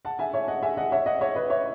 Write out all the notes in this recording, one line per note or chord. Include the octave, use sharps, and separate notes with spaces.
F#5 A5
E5 G#5
C#5 E5
D#5 F#5
E5 G#5
D#5 F#5
C#5 E5
D#5 F#5
C#5 E5
B4 D#5
C#5 E5